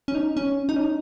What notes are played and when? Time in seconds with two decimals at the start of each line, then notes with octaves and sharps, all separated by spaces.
0.08 C#4
0.15 D#4
0.37 C#4
0.69 D#4
0.76 C#4
0.83 D#4